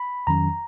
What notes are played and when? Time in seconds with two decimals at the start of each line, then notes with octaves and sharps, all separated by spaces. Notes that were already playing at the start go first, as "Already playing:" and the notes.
Already playing: B5
0.27 F2 D#3 F#3 C#4 A#5